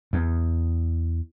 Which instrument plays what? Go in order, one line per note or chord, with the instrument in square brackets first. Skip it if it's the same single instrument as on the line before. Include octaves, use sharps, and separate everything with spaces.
[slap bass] E2